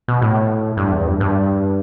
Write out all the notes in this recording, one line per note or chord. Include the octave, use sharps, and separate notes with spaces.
B2
A2
G2
E2
G2
G2